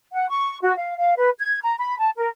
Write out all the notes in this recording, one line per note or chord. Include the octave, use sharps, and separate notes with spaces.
F#5
C#6
F#4
F5
F5
B4
G#6
A#5
B5
A5
A#4